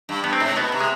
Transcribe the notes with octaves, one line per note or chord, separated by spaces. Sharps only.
G2
G2 B3
C4
G#2
C3
B2 B3
C3
G#3